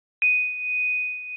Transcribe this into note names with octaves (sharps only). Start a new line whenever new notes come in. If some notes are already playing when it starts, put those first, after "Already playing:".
D#7